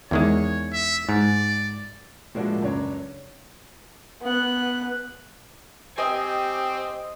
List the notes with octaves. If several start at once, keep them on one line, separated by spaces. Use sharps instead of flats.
E2 D#3 G#3 C#5
E5
G#2 D5
A2 F3 G#3 A#3 D4 F#4
C#2 F#2 D4 C#5
B3 F#6
C4 G4 D#5 G#5